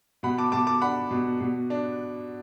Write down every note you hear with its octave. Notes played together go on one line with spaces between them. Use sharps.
B2 F#5 B5
A5 D6
B2 A5 D6
A5 D6
D4 F#5 B5
B2
B2
D4